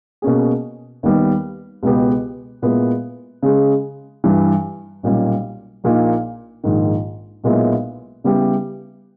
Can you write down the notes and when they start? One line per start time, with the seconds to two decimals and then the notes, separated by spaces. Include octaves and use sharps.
0.22 B2 A#3 C#4 G#4
1.03 D#2 D#3 G3 B3
1.83 C#2 B2 G#3 B3 G4
2.62 A#2 G#3 B3 E4
3.43 C#3 G#3 C#4 G#4
4.24 G2 E3 G3
5.03 B1 A#2 G3 C#4
5.84 A#1 A#2 A#3 D#4
6.64 A#1 G#2 D#3
7.43 B1 A#2 G#3 B3 E4
8.24 C#3 G3 B3 E4 G4